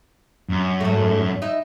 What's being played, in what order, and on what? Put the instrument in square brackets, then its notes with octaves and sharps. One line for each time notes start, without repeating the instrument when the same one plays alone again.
[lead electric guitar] F#2
[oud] G#2 A3
D#4 E4 E5